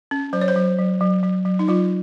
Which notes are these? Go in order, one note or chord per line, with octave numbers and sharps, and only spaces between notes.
C#4
F#3 C5
C#5
C5
F#3
F#3
F#3
F#3
F#3
D#4
F#3 F4